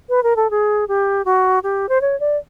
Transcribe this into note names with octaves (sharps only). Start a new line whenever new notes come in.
B4
A#4
A4
G#4
G4
F#4
G4
C5
C#5
D5